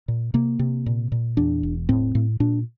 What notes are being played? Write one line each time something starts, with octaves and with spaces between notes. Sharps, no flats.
A#2
C3 A#3
C3
A#2
A#2
E2 D4
E1
A2 C4
A2
A#2 D4